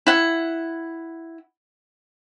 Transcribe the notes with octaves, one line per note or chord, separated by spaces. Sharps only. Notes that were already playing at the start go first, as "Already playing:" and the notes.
E4 F#5